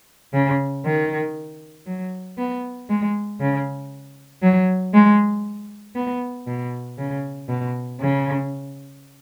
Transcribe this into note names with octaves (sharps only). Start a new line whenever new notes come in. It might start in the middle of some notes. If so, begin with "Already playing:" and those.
C#3
D#3
F#3
B3
G#3
C#3
F#3
G#3
B3
B2
C#3
B2
C#3